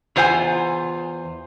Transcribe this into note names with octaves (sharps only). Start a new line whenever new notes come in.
E2 F4 C5 F#5 G#5